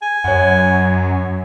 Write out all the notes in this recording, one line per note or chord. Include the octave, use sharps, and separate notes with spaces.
G#5
F#2 C#5 F#5